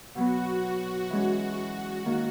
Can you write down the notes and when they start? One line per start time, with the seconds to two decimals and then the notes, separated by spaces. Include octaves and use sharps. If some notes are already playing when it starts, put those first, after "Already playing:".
0.15 B2 F#3 B3 F#4
1.10 E3 G#3 C#4
2.05 D#3 A#3